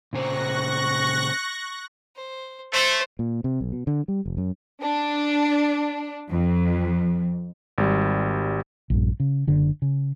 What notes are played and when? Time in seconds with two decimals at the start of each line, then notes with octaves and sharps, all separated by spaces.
0.13 A#2 C#3 C5 C#6 F#6 A#6
2.16 C5
2.73 A3 C5
3.19 A#2
3.44 C3
3.61 B1
3.72 B2
3.87 D3
4.08 G3
4.26 F1
4.37 F#2
4.82 D4
6.30 F2
7.78 G#1 G3
8.90 A#1 G2
9.20 C#3
9.47 F#1 D3
9.82 C#3